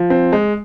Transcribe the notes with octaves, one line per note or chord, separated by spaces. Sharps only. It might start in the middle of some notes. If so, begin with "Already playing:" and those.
Already playing: F3
C4
G#3